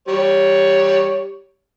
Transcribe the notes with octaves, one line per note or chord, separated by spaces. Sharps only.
G3 C#5